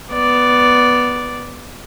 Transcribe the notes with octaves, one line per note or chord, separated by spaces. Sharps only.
B3 D5